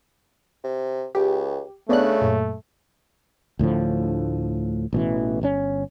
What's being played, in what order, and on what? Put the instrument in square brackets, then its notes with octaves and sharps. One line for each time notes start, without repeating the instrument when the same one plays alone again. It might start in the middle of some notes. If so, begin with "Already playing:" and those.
[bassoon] C3
[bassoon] C#2 [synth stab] G4
[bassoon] C#3 [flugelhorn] A3 [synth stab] B3 D4 F#6
[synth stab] F#2 A#2
[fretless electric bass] D2 A2 D3 F3
A1 B2 E3
G1 B2 C#4